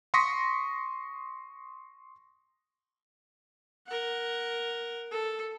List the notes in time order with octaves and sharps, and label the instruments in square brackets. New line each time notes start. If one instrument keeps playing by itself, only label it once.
[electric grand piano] C6 C#6 D#6 A#6 B6 C#7
[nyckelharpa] A#4 F#5
A4